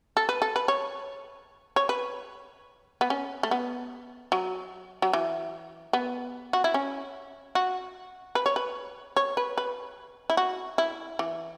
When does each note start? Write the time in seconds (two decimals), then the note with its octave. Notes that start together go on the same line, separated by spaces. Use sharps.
0.17 A4
0.29 B4
0.42 A4
0.56 B4
0.68 C#5
1.76 C#5
1.89 B4
3.01 B3
3.10 C#4
3.43 A3
3.51 B3
4.32 F#3
5.02 F#3
5.13 E3
5.93 B3
6.53 F#4
6.64 E4
6.74 C#4
7.55 F#4
8.35 B4
8.46 C#5
8.56 B4
9.17 C#5
9.37 B4
9.58 B4
10.30 E4
10.37 F#4
10.78 E4
11.19 E3